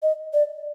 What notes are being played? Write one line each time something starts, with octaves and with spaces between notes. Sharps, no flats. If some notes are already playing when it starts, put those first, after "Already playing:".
D#5
D5